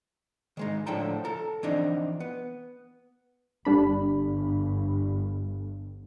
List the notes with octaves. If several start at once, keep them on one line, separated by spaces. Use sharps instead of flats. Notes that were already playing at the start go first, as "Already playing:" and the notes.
D#3 G#3 D#4
A2 D3 F3 A4 G5 A#5
A4 A#5
E3 F3 C4 D4 D#4
B3
G1 G2 G3 D4 B5